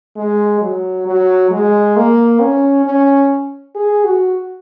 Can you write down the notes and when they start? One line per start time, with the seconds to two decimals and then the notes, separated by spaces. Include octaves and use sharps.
0.17 G#3
0.61 F#3
1.07 F#3
1.51 G#3
1.96 A#3
2.41 C#4
2.85 C#4
3.75 G#4
4.05 F#4